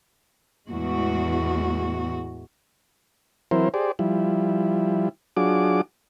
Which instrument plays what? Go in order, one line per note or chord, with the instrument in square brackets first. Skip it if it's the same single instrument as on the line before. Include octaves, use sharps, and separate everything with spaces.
[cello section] E2 A2 G#3 F#4
[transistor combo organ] E3 F#3 C4 E4 A#4 C5
G4 G#4 C5 D5
F3 G3 E4
F#3 D4 F4 F#4 G#4 D6